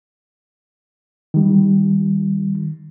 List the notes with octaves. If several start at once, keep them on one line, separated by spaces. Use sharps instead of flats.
D#3 G3